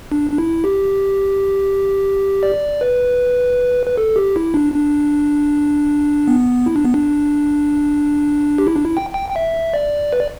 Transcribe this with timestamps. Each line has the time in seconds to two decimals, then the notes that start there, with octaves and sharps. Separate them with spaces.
0.12 D4
0.32 D4
0.38 E4
0.64 G4
2.43 D5
2.81 B4
3.87 B4
3.97 A4
4.16 G4
4.36 E4
4.54 D4
4.74 D4
6.28 B3
6.66 E4
6.76 D4
6.85 B3
6.94 D4
8.58 G4
8.67 E4
8.76 D4
8.85 E4
8.97 G5
9.14 G5
9.30 G5
9.36 E5
9.74 D5
10.13 B4
10.20 D5